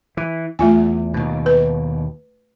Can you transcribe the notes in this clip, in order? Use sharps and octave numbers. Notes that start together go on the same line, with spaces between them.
E3
E2 A3 F4 G#5
D#2 B2
B4